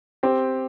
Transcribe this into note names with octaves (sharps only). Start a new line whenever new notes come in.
C4 G4